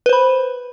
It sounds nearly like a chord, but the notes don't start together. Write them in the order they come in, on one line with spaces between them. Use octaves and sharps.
B4 C5 B5